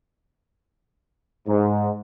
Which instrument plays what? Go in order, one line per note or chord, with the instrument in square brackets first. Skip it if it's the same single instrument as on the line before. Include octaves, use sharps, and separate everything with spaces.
[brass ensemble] G#2